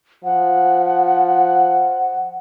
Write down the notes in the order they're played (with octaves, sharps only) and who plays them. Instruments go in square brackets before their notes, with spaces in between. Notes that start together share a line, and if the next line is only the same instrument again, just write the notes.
[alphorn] F3 [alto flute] F#5